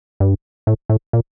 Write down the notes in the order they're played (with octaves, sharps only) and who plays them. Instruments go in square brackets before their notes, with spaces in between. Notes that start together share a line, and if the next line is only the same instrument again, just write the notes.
[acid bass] G2
A2
A2
A#2